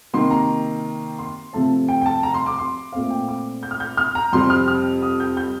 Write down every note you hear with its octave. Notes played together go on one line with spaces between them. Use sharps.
C3 D#3 A#3 C6
A#5
C6
C3 F3 A3 C4 A5
G5
G5
A5
A#5
C6
D6
C6
A#2 A3 C4 F5
G5
D6
G6
F6
G6
F6
A#5
F2 C3 G3 C4 C6
F6
F6
D#6
G6
G6